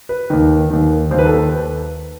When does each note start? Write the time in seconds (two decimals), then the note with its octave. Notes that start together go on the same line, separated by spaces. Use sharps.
0.09 B4
0.30 D#2 D#3
0.70 D#2 D#3
1.11 D#2 C5
1.14 D#3 B4
1.25 A4
1.33 B4